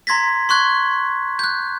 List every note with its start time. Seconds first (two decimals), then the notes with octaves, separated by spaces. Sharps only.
0.07 A#5 C6 G#6 A#6 B6
0.49 C6 C#6 F#6 G#6
1.39 F#6 G6